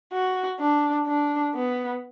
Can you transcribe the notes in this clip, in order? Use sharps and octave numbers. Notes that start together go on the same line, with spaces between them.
F#4
D4
D4
B3